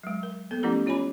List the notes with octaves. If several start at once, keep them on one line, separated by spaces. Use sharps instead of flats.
F#3 G#3
A#4
A#3 B3 A4
F3 A3 C#4 E4 G4 A#4
C#4 F4 C#5 G#5 B5